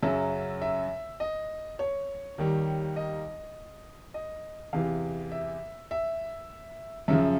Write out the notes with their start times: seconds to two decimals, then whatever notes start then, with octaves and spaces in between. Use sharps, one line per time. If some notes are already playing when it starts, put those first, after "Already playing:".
0.02 F#2 C#3 F#3 E5
0.62 E5
1.20 D#5
1.79 C#5
2.38 D#2 D#3 G3
2.96 D#5
4.14 D#5
4.73 E2 C3 E3 F5
5.32 E5
5.91 E5
7.08 F#2 C#3 F3 E5